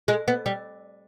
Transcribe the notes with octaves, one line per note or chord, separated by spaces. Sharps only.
G#3
B3
G3